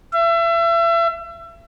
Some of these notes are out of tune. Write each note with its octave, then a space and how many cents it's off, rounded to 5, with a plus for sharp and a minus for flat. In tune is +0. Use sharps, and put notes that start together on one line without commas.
E5 +35